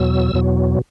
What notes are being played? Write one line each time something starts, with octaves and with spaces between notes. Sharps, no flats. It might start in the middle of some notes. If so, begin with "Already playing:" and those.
Already playing: E2 B2 F#3 E6
E2 B2 F#3